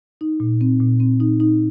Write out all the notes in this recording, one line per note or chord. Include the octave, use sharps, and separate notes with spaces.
D#4
A#2
C4
A#2
C4
D#4
D#4